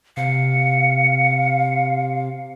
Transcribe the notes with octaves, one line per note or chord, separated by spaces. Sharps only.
C3 F5 C#7